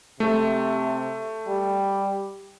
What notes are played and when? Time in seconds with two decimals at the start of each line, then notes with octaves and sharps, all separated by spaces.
0.20 C3 A3
1.47 G3